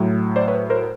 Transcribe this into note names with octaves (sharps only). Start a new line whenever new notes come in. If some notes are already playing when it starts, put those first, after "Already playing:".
Already playing: A2 F#3
C5 D5
B4 C#5
A#4 C5